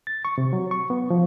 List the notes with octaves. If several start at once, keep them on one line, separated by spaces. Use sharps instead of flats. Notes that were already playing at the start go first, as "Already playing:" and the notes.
A6
C#6
C3
F#3
C#6
B3
F3